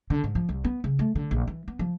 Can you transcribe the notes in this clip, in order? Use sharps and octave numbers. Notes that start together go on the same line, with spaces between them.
D3
G#2
F3
C2
B3
C#3
A3
D3
A#1
E3
B3
F3